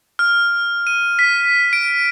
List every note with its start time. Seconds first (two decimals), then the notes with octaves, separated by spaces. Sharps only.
0.19 F6
0.87 D#7
1.19 B6
1.73 D7